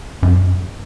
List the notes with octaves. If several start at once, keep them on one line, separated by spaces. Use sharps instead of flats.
F#2